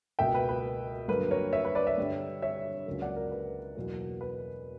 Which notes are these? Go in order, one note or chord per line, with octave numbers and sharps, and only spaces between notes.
C#2 B2 A#3 E5 G5
B4
B4
G2 D3 F#3 A#3 B4
A#4 C#5
C#5 E5
B4
B4 D5
C#5 E5
G2 D3 G3
C#5 E5
C#2 C#3 F#3 A#3
D5 F#5
A#4
B4
E2 B2 F#3 A#3
B4